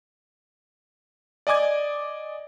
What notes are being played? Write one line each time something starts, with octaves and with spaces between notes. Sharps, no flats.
D5 D#5 G#5 D6 G#6